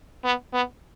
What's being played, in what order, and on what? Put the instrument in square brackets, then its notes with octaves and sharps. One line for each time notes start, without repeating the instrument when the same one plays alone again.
[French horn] B3
B3